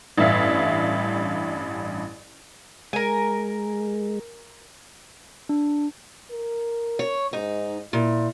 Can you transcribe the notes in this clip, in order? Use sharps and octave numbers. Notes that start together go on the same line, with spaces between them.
A1 G2 E5 F5
G#3 A#4 G#5
D4
A#4
C#5
G#2 D#4
A#2 E4